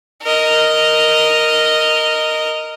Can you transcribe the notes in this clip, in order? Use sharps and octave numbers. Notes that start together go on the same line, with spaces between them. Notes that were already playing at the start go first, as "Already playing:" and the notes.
A#4 D#5